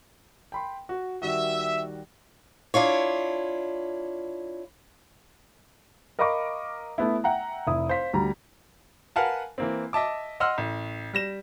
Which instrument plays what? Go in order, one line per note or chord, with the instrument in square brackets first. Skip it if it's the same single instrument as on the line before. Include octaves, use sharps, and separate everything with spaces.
[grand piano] G5 B5 C6
F#4
[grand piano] D#3 G3 F#4 [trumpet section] E5
[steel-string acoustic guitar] D4 E4 F4 C#5
[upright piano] A#4 D#5 F5 B5 C#6 D6
A3 B3 E4
E5 F#5 G5 A#5
F1 E4 D#6
C5 F5 B6
D2 G3 A#5
A#4 B4 F5 F#5 G#5 A5
E3 A#3 C4
D#5 E5 A5 D6
D#5 F#5 C6 E6 F6
A1
G3 A#6 E7